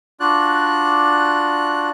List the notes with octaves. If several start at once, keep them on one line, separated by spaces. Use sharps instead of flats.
D4 F4 F#4 D5 F#6